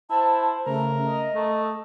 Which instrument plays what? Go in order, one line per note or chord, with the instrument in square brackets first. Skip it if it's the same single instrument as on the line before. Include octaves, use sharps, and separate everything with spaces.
[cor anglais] E4 [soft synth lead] C5 [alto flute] A5
[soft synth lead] C#3 [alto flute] A3 [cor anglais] A#4
[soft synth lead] D#5
[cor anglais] A3 [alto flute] A4